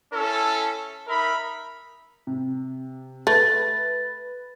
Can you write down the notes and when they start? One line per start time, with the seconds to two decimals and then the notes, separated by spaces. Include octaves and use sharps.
0.13 C#4 E4 A4
1.08 D#4 A#4 E5 B5
2.27 C3
3.27 A3 B4 A6